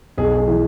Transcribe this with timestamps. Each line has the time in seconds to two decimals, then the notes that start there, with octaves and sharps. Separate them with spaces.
0.18 B1 G#4
0.38 G#4
0.48 E3